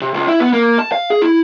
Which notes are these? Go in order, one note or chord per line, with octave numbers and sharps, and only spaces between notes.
C3
C#2
E4
B3
A#3
A5
F5
G#4
E4